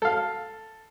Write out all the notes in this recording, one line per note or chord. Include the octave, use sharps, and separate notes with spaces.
A4 F5